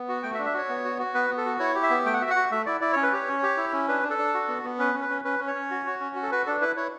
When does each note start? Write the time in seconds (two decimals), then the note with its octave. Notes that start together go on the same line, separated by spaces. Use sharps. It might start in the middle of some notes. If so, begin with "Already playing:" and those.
Already playing: B3
0.08 F#4
0.23 A3 G5
0.34 E5
0.39 D4
0.46 E5
0.54 F#4 C#5
0.69 B3
0.85 F#4
0.99 F#4
1.14 B3 B4
1.30 B3
1.37 A4
1.45 F#4
1.60 E4 C#5
1.75 G4
1.83 E5
1.90 B3
2.05 A3 G5
2.14 F#5
2.21 F#4 E5
2.30 F#5
2.36 F#4
2.51 A3 E5
2.66 E4 D5
2.81 E4 D5
2.93 C#4 C#5
3.03 B4
3.13 G4 C#5
3.28 C#4
3.43 G4
3.57 E4
3.73 C#4
3.88 D4 B4
4.03 D4
4.10 A4
4.19 D4
4.34 F#4
4.48 B3
4.63 B3
4.79 C#4 B4
4.94 C#4
5.02 B4
5.09 C#4
5.24 C#4 B4
5.39 C#4
5.47 C#5
5.55 C#4
5.71 F#4
5.86 F#4
6.00 C#4
6.16 F#4
6.23 A4
6.31 F#4 B4
6.46 D4 A4
6.61 E4 B4
6.76 E4 C#5